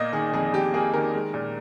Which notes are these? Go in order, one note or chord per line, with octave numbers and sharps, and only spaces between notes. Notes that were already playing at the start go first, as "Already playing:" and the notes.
Already playing: A#2 A#3 D#5
D#3 G#4
F2 G#4
F2 G4
A#3 G#4
D#3 A#4
G#3
A#2